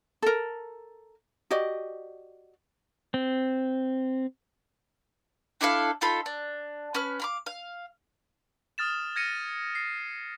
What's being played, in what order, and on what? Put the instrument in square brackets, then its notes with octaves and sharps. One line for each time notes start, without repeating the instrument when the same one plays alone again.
[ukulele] A4 A#4
F#4 G4 D5 D#5
[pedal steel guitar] C4
[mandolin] D4 E4 A4 F5
D#4 F4 A4 B5
D4
C#4 B4 F6
F5 B5 D6
F5
[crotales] D#6 F6 A6 E7
F6 G#6 A#6 C#7 D#7
C7